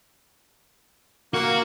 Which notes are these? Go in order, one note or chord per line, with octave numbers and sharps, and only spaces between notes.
A#3 F#4